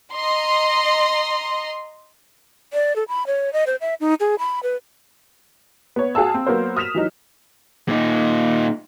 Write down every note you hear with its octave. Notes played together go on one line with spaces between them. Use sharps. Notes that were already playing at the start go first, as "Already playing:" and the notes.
D#5 A#5 C6
D5
A4
B5
C#5
D#5
C5
E5
D#4
G#4
B5
B4
B3 C#5
F#4 G#4 F5 A5 E6
C4
F#3 A#3 B3 F#4 A#4 C5
D#6 F6 B6 E7 F7
E3 F#3 D#4
A#2 D#4